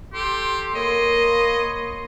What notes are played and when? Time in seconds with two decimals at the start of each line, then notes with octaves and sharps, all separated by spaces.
0.13 G4 A4 C6
0.75 A#3 C#5 D#5 B5 C6